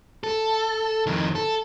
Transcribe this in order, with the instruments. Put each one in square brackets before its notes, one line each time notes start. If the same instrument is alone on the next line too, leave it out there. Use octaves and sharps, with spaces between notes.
[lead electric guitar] A4
F2 D#3
A4